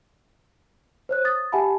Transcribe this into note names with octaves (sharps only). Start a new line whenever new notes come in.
C5 C#5 F#6
D#6 A6
G4 E5 F#5 G#5 A5 B5